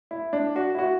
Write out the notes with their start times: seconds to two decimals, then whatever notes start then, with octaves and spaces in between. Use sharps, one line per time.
0.11 E4
0.33 D4
0.56 F#4
0.75 E4
0.79 F#4